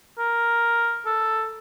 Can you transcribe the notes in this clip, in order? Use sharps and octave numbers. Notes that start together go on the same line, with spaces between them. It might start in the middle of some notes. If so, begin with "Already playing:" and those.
A#4
A4